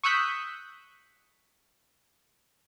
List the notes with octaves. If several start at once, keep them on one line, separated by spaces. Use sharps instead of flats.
C#6 D#6 E6 F#6 G6 B6